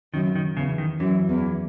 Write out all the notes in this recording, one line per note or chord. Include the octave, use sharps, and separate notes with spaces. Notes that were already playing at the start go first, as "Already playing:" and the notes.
F#2 D#3
D#3
E2 C#3
D#3
F#2 E3
E2